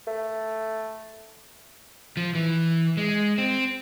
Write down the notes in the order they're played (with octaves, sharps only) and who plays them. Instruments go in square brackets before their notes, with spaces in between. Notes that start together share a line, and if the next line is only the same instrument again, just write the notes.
[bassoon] A3
[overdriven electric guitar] F3
E3
G#3
C4